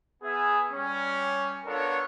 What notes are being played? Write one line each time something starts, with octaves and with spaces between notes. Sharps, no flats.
B3 G#4 E5
G3 C#4
B3 D4 F4 A4 A#4 C#5